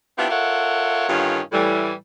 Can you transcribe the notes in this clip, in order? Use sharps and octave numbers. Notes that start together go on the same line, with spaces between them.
B3 C4 D4 E4 F4 G4
F4 A4 A#4 C#5 E5 F#5
G2 D3 D#3 C#4 F4
A2 E3 G3